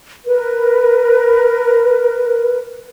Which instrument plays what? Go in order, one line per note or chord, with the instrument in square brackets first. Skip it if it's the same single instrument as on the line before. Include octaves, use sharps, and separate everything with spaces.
[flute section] A#4 B4